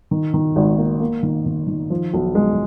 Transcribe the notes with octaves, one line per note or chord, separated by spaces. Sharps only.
D#3
D#3
G#1
A#3
A#3
D#3
D#3
D#3
F3
B1
G#3